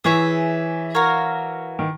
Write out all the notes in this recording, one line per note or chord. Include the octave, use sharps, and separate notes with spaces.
E3 G#4 C#5 E5
F#4 A#4 C#5 F5
D#3